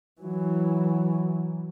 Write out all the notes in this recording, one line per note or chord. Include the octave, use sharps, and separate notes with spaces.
E3 F#3